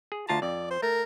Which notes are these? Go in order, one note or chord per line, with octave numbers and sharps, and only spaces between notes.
G#4
D2 F4 A5 A#5
F2 D5
C5
A3 A#4